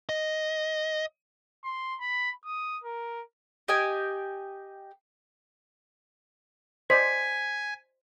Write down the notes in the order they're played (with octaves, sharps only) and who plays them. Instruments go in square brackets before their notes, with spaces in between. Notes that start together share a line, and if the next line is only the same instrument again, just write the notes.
[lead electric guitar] D#5
[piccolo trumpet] C6
B5
D#6
A#4
[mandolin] G4 D#5 G5 G#5
[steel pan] C5 D5 D#5 [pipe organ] G#5 [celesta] B6